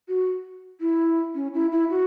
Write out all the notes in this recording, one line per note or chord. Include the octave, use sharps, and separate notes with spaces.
F#4
E4
C#4
E4
E4
F#4